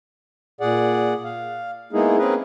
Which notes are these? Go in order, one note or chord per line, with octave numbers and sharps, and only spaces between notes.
A#2 G#4 D5 F#5
F5
G#3 A#3 B3 D#4 E4 G#4
A#3 C4 C#4 G#4 A#4 B4